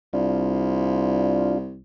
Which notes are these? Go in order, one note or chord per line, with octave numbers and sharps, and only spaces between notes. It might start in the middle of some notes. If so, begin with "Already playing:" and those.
C2 D4 F4